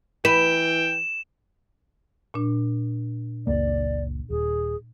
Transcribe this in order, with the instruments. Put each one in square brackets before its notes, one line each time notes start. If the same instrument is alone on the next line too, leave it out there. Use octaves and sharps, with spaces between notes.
[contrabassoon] E3 [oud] B4 [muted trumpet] G5 [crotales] E7
[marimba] A#2 D4
[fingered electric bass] F#1 C#2 A#3 [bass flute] D5
[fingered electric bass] D#1 [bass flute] G#4